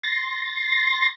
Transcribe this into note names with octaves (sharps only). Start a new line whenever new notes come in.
C6 A6 A#6